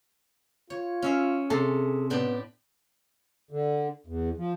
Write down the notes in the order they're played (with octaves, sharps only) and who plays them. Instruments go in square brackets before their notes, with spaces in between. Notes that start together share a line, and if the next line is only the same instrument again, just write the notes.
[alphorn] F4 [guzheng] C#5
[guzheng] C#4 E5 F5
[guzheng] C3 [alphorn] G#4 [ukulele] A4
[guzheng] A2 D4 G4 [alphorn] B3
[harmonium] D3
E2
F3